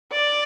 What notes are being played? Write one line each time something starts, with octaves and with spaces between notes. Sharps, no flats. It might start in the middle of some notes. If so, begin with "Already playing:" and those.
D5